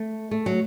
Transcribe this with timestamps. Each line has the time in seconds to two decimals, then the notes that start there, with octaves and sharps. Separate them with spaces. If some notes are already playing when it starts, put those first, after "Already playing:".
Already playing: A3
0.31 A3
0.46 F#3